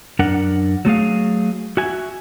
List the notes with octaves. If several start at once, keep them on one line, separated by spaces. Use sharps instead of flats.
F#2 D4 A#4 F#5
F#3 A3 G#4 F5
F#4 E5 G#5